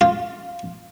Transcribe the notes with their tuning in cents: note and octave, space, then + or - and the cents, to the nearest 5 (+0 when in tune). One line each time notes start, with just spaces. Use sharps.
F4 +0